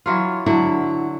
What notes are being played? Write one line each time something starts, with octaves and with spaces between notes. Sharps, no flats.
E3 F#3 F4
D3 F#3 E4